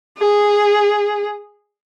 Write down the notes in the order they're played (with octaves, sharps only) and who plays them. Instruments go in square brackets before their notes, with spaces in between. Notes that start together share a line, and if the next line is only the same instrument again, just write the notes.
[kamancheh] G#4